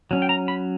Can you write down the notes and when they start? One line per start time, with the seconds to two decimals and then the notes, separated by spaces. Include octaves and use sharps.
0.11 F#3 C#4
0.22 G5
0.29 A#5
0.48 B5